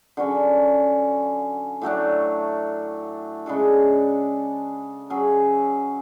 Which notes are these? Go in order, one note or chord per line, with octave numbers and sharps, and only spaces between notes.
D3 F#3 C#4
A2 F#3 A3 D4
C#3 G#3 D4 A4
F#3 C#4 G#4